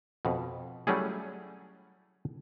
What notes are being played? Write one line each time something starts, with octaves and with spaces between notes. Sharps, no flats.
F2 B2
F#3 G3 A3 C#4 E4 G#4